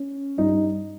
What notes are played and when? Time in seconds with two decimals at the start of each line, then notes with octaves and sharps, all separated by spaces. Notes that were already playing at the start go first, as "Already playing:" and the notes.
Already playing: C#4
0.37 G2 G3 D#4